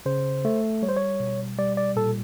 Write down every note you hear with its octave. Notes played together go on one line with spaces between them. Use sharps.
C#3 C5
A3
G3 C#5
C5
C#5
B2
G3 D5
D5
A#2 A4